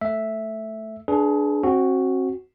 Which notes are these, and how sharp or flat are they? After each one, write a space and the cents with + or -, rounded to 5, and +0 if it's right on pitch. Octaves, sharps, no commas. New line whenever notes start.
A3 +0 E5 +0
D4 +0 G#4 +25 B4 +0
C4 +30 F#4 +0